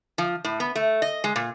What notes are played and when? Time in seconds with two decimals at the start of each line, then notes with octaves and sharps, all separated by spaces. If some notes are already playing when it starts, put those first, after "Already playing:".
0.18 F3
0.44 A2
0.60 B3
0.75 A3
1.02 D#5
1.24 G#3
1.36 A#2